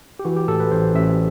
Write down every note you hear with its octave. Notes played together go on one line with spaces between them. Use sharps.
G4
E3 F#4
G4
A2 A4
B4
A1 C5
A1 E5